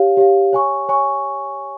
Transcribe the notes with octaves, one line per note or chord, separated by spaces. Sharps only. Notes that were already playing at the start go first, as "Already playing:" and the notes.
Already playing: G4 C#5 F5
G4 C#5 F5
C#5 G#5 C#6
C#5 G#5 C#6